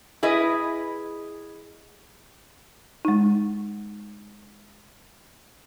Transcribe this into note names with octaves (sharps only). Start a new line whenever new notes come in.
E4 G#4 B4 D#5
G#3 D#4